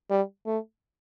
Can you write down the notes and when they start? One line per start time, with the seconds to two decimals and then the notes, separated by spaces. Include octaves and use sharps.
0.10 G3
0.46 A3